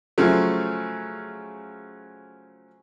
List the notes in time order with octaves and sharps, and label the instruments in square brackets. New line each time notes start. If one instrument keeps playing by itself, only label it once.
[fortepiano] C#3 F3 F#3 A3